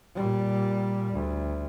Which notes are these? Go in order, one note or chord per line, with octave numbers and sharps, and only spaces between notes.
A#2 G3
D2